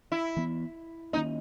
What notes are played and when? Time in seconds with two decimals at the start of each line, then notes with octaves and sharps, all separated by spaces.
0.12 E4
0.37 E3 B3
1.13 D#3 A#3 C#4 D#4